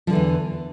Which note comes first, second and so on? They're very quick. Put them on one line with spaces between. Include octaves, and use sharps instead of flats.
F3 D3 E3 E2